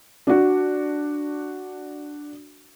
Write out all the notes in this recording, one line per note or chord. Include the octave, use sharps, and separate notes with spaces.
D4 F#4